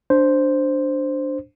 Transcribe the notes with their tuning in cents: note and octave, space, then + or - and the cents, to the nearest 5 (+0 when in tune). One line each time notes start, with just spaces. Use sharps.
D4 +0 C5 +0